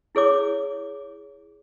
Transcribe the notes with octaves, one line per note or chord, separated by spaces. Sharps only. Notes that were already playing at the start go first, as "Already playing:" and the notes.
E4 G#4 C#5 D6